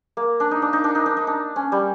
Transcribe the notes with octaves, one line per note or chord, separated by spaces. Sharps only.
A#3
D4
D#4
D4
D#4
D4
D#4
D4
D#4
D4
C#4
G3